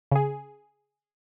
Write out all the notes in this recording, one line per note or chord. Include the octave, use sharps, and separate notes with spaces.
C#3 G#4